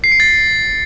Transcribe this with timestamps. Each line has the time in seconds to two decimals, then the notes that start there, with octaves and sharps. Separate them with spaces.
0.04 C7
0.12 C#7
0.20 A6